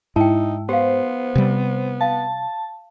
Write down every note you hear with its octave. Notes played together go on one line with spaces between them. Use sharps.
G#2 D#4 E4 G5 A5
B3 G4 C5 F5
C3 G3
F5 A5